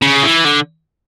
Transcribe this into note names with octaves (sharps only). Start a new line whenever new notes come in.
C#3
E3
D3